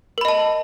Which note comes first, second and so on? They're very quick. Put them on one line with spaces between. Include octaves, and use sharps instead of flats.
A#4 B5 D#5 A5